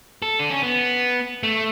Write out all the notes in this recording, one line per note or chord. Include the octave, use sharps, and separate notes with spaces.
A4
D4
C#4
B3
A3